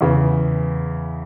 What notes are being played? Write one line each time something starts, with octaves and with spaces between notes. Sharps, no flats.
E2 C#3 E3